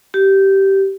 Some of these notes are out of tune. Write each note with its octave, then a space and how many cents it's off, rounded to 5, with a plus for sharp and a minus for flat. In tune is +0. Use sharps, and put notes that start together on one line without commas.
G4 -15